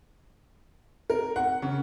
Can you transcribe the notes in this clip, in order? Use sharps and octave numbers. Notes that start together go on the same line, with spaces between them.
A#4
F#5
C#3